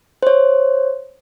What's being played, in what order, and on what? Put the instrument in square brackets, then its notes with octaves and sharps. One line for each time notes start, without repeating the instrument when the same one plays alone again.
[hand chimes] C5 C#5